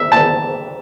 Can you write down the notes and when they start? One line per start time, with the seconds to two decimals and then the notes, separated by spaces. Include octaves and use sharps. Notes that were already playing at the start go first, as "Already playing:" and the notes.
Already playing: E5
0.12 A5